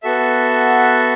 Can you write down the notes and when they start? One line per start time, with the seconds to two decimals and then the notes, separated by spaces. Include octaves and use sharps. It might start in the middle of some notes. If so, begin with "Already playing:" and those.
0.03 B3 F#4 A4 E5